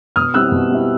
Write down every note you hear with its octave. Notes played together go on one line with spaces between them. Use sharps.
B2 D#6 F6
G3 C4 E4 E6 F#6
B2
G3 C4 E4